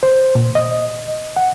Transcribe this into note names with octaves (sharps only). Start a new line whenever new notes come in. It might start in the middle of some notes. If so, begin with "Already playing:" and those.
C5
A#2
D#5
F#5